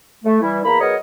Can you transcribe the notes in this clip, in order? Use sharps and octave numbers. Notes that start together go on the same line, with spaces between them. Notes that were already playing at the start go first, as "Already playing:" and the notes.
A3
E3 G3 E4
E2 A#3 A#5 B5
F#3 B3 G#4 A#4 C#5 D#5